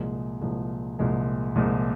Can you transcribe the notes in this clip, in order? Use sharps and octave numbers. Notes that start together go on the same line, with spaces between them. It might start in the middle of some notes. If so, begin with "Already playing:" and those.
Already playing: C2 A#2 F3 G#3
C2 A#2 F3 G#3
C2 A#2 F3 G#3
C2 A#2 F3 G#3